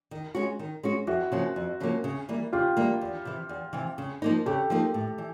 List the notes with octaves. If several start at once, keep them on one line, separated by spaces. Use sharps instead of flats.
D#3
G#3 C#4 F#4
D#3
G#3 C#4 F#4
F2 E4 F#4
C#3 F3 A#3 C#4
F2
C#3 F3 A#3 C#4
C#3
E3 G3 A#3
C#3 F4 G4
E3 G3 A#3
E2
C3 E3
E2
C3 E3
C#3
F3 A#3 D#4
C#3 G4 A4
F3 A#3 D#4
A2
E3